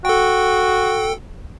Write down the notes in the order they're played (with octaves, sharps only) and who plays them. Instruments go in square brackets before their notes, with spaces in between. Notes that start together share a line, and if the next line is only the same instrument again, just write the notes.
[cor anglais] F#4 [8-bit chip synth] A4 G5